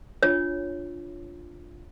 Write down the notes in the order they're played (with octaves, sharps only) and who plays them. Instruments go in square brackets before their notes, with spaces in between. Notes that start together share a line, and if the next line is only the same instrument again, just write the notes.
[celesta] D4 F4 [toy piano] C#5